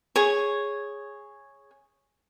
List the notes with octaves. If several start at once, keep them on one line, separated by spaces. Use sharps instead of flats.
G#4 C#5